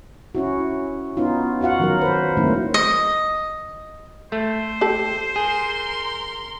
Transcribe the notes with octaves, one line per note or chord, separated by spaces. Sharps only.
C#4 E4 F#4
B3 C#4 D#4 F4
F4 F#4 F5 F#5
D#3 F#3 A#4
B4 C5
D#3 F#3 A3 A#3 C4 E4
D#5
A3 C5
G4 A4
G#4 A#4 C6